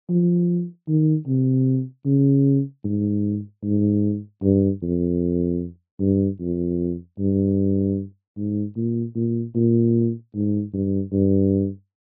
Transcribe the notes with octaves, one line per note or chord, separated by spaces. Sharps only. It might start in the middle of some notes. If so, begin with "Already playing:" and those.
F3
D#3
C3
C#3
G#2
G#2
G2
F2
G2
F2
G2
G#2
A#2
A#2
A#2
G#2
G2
G2